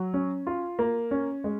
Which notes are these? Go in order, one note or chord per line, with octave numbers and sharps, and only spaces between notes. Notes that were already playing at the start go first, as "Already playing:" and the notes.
Already playing: F#3
C#4
F4
A#3
C#4
G#3